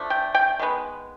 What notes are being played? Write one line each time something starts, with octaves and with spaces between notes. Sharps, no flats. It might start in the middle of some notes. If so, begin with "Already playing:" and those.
Already playing: D3 F3 A3
G5
G5
D#3 G#3 B3